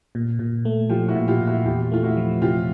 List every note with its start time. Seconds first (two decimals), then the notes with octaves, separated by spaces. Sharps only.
0.15 A#2
0.39 A#2
0.65 A3
0.89 F3 F4 G4
1.08 E4 F#4
1.15 A#2
1.28 F4 G4
1.41 A#2
1.47 E4 F#4
1.65 E2 F4 G4
1.92 A3 F4
2.03 E4 F#4
2.17 F3
2.42 C3 F4 G4